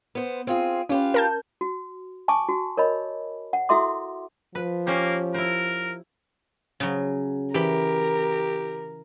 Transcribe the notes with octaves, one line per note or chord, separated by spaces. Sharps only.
B3 C5
C4 F4 G#4
C#4 F4 G4 B4
A#4 A5 G6
F#4
G#5 A5 C#6 D6
F#4
A#4 C#5 D#5 B5
F#5
E4 F#4 A4 E5 C6 D6
F3 B4
A#3 C#4 G4 C5
E4 A#4 C5
C#3 F#3
E3 G4 A#4